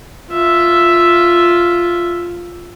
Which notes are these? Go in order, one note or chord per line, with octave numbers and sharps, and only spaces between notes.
F4 E5